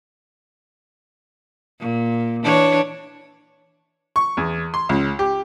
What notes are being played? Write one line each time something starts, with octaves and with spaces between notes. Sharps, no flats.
A#2
E3 D4 C#5
C#6
E2
C6
C#2
G4